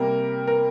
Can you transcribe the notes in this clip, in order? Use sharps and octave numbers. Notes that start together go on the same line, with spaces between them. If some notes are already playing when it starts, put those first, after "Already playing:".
Already playing: C3 G3 A#3 A#4
A#4